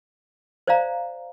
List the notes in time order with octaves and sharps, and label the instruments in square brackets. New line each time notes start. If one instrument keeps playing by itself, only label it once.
[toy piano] C5 D5 D#5 F5 A#5